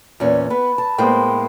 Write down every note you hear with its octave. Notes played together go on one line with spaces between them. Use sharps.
E2 A#2 C#4
B3 B4
A5
A2 G#3 A#3 B3 C5 G5